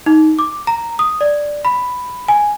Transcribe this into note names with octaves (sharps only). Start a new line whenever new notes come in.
D#4
D6
A#5
D#6
D5
B5
G#5